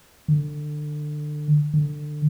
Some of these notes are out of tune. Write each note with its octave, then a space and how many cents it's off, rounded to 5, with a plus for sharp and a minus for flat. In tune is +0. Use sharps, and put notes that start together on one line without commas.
D3 +25
D3 +25